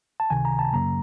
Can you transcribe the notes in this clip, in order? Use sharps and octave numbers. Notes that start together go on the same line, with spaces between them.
A5
C#2 C3 D#3 G#5
A#5
A5
F#2 C#3 F#3 A#3 A#5